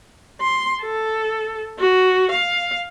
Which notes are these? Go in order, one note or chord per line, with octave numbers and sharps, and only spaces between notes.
C6
A4
F#4
F5